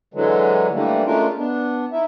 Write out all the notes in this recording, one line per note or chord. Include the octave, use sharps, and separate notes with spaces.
D3 E3 F#3 G#3
D3 E3 G3 A3 A#3
G#3 A3 C#4 D4 F4 A#4
B3 D4
D#4 E4 E5